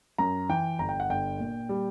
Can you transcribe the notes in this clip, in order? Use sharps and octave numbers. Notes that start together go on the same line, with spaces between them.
F#2 A#5
E3 G5
G1 A#5
G5
F#5
G1 G5
A#2
G3